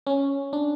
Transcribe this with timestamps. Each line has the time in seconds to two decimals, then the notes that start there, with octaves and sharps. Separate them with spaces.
0.07 C#4
0.53 D4